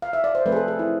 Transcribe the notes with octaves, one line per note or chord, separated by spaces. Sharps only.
F5
E5
D5
C5
F3 A3 C4 B4
G#4
A4
G#4
E4